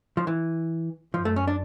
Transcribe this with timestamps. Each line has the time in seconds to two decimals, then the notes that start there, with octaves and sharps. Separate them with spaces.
0.17 F3
0.27 E3
1.14 F#2 F3
1.25 A3
1.36 C#4
1.47 D4